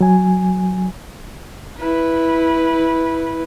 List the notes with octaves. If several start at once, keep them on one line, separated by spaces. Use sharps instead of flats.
F#3 G#5
E4 B4